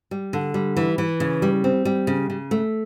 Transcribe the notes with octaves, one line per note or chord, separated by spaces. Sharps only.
G3
D3
G3
E3
E3
C#3
G3
C4
G3
C#3
C#3
A3